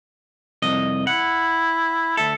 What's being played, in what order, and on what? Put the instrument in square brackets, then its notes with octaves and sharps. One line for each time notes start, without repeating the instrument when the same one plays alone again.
[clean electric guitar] C2 F2 D#5
[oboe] E4 [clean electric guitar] F#5
[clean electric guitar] D2 A4 [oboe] E5